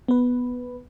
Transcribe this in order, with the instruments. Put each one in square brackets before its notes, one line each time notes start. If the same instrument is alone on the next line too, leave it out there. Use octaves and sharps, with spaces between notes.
[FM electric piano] B3 B4